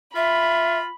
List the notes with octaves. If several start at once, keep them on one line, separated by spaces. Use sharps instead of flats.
F4 E5 B5